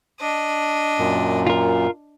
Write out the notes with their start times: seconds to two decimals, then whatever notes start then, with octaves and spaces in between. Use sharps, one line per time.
0.20 D4 D#5
0.99 F#2 A#2
1.47 F4 A#4